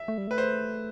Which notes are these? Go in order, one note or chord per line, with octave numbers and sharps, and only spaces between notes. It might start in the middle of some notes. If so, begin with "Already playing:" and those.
Already playing: E5
A3
G3
A3 B4
C5